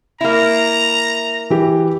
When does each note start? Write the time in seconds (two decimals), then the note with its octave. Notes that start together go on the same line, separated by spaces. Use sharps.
0.21 A#3 E4 A#5
1.50 E3 G4